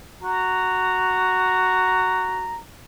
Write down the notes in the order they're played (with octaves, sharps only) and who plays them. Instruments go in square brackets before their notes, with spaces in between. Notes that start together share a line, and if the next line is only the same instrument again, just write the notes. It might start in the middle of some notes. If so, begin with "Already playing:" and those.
[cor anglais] F#4 [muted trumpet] A#5